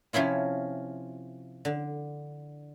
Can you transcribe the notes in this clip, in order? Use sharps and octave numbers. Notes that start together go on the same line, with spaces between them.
C3 F3 C#4 E4 F4
D3